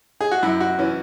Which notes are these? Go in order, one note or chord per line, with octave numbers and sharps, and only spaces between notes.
G#4
F#4
F#2 E4
F#4
E3 C#4